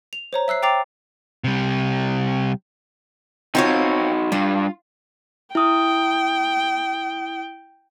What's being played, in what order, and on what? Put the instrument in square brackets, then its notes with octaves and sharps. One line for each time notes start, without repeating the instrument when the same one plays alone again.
[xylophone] F7
C5 C#5 A#5
E5 E6 F#6 C7
G5 A#5 D6 A6 C7 F7
[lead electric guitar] C3 G3
[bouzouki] C4 F4 C#5 [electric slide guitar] D#4 F#4
[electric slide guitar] G3 D4 [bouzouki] F4
[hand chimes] E4 D#6 [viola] G5